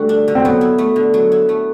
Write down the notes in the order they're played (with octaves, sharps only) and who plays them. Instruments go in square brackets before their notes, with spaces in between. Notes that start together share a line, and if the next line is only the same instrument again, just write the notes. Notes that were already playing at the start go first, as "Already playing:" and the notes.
Already playing: [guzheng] D3 G3 F#4 [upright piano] A3
[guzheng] D4
D3
[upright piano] C4
[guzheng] F#3 [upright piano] B3
[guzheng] E4
A3
D3
F#3
E4
A3